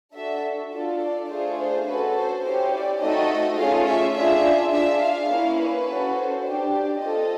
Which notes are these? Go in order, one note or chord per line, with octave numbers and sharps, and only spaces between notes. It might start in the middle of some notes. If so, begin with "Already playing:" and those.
D4 F#4 A4 E5
D4 F4 A4
D5
A3 D4 F4 G#4 C5
C5
C#4 F#4 A4 B4
C5
C#4 E4 G4 C5
D5
A3 C4 D#4 F#4 A4 D#5
A3 C#4 F4 G#4 F5
E5
D4 F4 G#4 E5
D4 F4 G#4 E5
F5
A#3 C#4 E4
B4
C#4 F#4 A4
C5
D4 G4
D5
C4 F4 A4 D#5